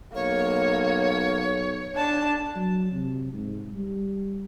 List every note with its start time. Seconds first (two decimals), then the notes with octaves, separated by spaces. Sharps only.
0.15 B1 A#3 C#5
1.96 D4 A5
2.56 F#3
2.92 C3
3.32 G#2
3.74 G3